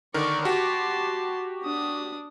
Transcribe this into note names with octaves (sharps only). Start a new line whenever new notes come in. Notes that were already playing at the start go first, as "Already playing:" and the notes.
D3 D#3 A#4 D5 C#6
F#4 G4 A5 C6
D4 D#6